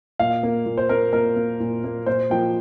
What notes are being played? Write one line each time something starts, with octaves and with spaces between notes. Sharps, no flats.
A#2 F5
A#3
A#2
C5
A#3 A#4
A#2 A#4
A#3
A#2
A#3
A#2 C5
F3 A#3 G5